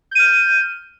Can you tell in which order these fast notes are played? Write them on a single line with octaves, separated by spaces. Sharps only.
G6 D#7 F6